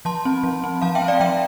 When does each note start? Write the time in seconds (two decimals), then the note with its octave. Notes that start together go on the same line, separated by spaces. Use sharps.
0.05 F3 A5 C6
0.25 C4
0.43 F3
0.64 C4
0.82 F3 F5 A5
0.95 E5 G5
1.02 C4
1.08 D5 F5
1.20 F3 E5 G5